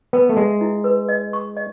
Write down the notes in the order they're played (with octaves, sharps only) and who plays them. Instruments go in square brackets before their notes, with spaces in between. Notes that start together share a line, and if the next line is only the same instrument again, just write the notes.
[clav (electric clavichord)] B3 [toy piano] B4
[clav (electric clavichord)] A3
[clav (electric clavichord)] G#3 [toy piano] E5
[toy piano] E4
B4
D#5
C#6
D#5